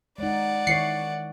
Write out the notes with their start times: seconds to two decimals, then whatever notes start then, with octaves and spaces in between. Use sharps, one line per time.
0.18 G#3 D#4 D5 F#5
0.67 D#3 E4 C#5 C7 C#7